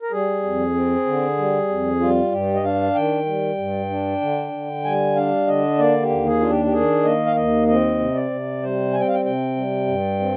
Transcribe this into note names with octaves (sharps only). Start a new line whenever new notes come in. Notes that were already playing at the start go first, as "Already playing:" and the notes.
A#4
G3 G#4
F2
C4
D3
G3
F2
G3 F4
G2 G4
D#5
D4 F5
D#3 G5
G3
G2
D4
D3
D3
G3 G#5
D4 F5
D3 D#5
A#3 D5
G4
D#2
G#4
D4 F4
G4
G4
D#3 G#4
A#3 D#5
F5
D#2 D#5
C4 D#5
C3
D5
C3
G3 C5
C4 G#5
G5
F5
G5
C3 G5
G3
G2
C4